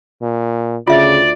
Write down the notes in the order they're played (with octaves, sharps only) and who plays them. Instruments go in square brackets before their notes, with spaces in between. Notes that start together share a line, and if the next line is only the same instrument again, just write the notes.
[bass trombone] A#2
[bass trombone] D2 [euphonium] C#3 [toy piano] F4 E5 [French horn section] D5